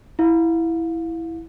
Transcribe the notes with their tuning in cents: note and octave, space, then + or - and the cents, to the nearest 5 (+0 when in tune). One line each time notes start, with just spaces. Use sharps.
E4 +0 F5 +30